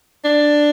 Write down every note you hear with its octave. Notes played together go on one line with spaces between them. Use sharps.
D4